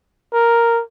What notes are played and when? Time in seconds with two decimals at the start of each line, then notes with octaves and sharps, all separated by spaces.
0.33 A#4